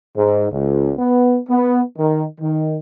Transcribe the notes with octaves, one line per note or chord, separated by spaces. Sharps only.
G#2
C#2
B3
B3
D#3
D#3